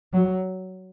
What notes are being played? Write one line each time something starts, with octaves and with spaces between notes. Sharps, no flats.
F#3